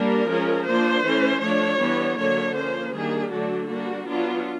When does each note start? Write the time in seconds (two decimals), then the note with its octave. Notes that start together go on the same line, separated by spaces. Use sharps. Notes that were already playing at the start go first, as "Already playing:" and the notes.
Already playing: G3 A#3 D4 A#4
0.29 F3 G#3 C#4
0.66 F3 A#3 D4 C5
1.04 E3 A3 C#4
1.42 F3 A3 D4 C#5
1.80 E3 G3 B3 D4
2.18 D3 F#3 A#3 D4 C#5
2.55 F3 A#3 C#4 C5
2.94 D#3 G3 A#3 D4 G#4
3.32 D3 F#3 A3 D4 F#4
3.70 G3 A#3 D4 F#4
4.07 F#3 B3 D4 F4